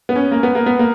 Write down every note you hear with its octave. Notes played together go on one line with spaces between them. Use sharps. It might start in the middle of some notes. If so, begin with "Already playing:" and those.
B3
C#4
A#3
B3
A#3
B3
A#3